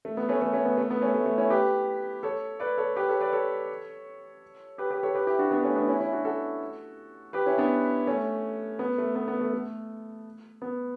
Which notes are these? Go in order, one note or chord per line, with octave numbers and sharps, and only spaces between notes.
A3
B3
A3 C#4
A3 C#4
A3 C#4
B3
A3
B3
A3 C#4
A3
A3
C#4 E4
G4 B4
A4 C#5
B4 D5
A4 C#5
G4 B4
A4 C#5
B4 D5
A4 C#5
G4 B4
G4 B4
A4 C#5
G4 B4
E4 G4
D4 F#4
B3 D4
A3 C#4
B3 D4
C#4 E4
C#4 E4
D4 F#4
F#4 A4
G4 B4
C#4 E4
B3 D4
A3 C#4
B3
A3
B3
B3
A3
A3
B3